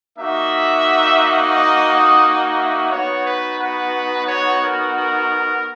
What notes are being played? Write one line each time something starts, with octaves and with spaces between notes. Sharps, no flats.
A#3 D#4 F#4 E5
D#5
D#5
E5
B3 D#4 F#4 C#5
B4
B4
C#5
A#4
A#4